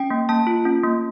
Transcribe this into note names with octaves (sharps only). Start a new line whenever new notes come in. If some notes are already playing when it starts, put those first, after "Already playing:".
Already playing: C#4 G5
A#3
A#3 A5
F4
C#4
A#3